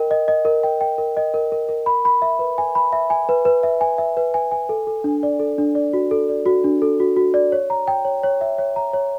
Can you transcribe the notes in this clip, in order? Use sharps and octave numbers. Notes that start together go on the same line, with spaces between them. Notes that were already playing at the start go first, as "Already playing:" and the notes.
Already playing: A#4 D#5 G5
D#5
D#5
A#4
G5
G5
A#4
D#5
A#4
A#4
A#4
B5
B5
E5
B4
G#5
B5
E5
G#5
B4
B4
E5
G#5
E5
B4
G#5
G#5
A4
A4
D4
D5
A4
D4
D5
F#4
A4
D5
F#4
D4
A4
F#4
F#4
D5
C#5
A#5
G5
C#5
C#5
E5
C#5
A#5
C#5